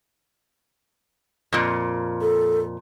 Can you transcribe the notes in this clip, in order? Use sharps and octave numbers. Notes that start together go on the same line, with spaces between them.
F2 A#2
A4